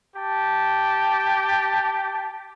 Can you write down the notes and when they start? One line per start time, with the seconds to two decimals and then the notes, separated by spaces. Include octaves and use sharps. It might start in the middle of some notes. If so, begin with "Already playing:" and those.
0.16 G4 A5